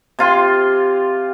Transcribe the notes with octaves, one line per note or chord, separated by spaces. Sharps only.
C3 F4 C6